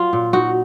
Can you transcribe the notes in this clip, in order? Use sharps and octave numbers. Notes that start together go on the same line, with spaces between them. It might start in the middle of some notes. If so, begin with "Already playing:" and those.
Already playing: F#3 F4
A#2
D#4 F#4